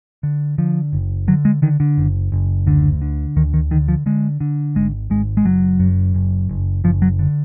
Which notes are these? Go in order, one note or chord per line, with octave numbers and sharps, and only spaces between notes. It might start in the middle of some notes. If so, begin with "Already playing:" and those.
D3
D3 F3
F#1
D3 F#3
G#3
D3 D#3
D3
F#1
F#1
D2 D3
D3
D2 D#3
D#3
D3 D#3
F3
D3 G#3
D3
G#1 G#3
G#1 G#3
G#3
F#1 F#3
F#2
F#1
F#1
F#1 F3
F#3
D3